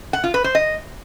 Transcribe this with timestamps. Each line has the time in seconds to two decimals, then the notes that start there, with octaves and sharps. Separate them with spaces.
0.13 F#5
0.24 F4
0.34 B4
0.44 C5
0.55 D#5